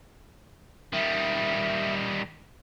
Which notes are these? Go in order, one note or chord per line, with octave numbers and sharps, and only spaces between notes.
D#3 G3 E5